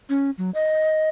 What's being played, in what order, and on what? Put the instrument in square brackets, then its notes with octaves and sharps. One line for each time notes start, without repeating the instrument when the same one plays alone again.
[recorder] C#4
F#3
D#5